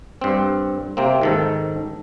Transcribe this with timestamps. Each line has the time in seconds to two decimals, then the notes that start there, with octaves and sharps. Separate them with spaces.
0.21 G2 C4
0.97 C3 A#3 C4
1.21 G#2 D#3 A4